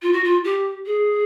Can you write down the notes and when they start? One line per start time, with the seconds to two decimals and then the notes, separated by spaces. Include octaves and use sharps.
0.02 F4
0.13 F#4
0.23 F4
0.44 G4
0.86 G#4